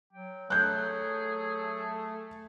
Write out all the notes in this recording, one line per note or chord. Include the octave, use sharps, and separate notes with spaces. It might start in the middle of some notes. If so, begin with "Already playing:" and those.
F#3 G5
F#3 A3 G#4 F#6 G6